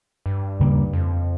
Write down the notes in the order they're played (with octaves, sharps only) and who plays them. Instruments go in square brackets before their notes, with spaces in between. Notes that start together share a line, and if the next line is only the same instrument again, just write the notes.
[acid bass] G2
[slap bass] D#2 C#3 G3 A#3
[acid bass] F2